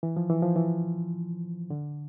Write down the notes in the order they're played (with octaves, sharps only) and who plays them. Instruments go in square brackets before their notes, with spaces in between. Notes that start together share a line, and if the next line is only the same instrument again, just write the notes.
[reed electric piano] E3
F3
E3
F3
E3
D3